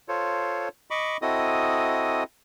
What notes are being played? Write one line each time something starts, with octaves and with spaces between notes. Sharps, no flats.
F4 A4 C5 C#5
D#5 B5 C#6 D6
C4 E4 F#4 A4 D#5 D#6